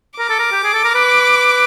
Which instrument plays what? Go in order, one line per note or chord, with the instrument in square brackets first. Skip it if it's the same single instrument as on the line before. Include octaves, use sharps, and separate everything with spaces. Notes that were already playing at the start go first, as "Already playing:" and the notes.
[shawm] A#4 [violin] D6
[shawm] A4
A#4
G4
G#4
A4
A#4
B4